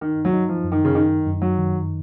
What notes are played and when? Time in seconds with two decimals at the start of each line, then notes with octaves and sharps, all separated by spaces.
0.01 D#3 D#4
0.25 F#3
0.34 D#4
0.49 F3
0.64 F#2
0.72 D#3
0.85 C#3
0.95 D#3 D#4
1.26 F#2
1.42 F#3
1.58 D#3